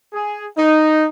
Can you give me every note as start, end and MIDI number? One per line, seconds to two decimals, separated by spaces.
0.13 0.47 68
0.58 1.06 63